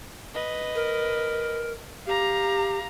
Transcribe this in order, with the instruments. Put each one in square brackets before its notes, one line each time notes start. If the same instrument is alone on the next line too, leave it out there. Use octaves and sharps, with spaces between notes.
[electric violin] B4 D#5
[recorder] A#4
[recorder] G4 [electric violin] F5 A#5